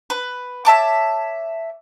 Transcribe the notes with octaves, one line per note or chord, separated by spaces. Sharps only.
B4
C#5 E5 A5 D6